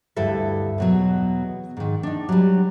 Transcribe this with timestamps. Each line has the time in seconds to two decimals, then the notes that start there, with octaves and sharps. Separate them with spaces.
0.16 D2 G2 E4 A4 E5
0.78 E2 B2 F#3
1.77 G#2 D#3
2.03 D4 D#4
2.29 F#3 G3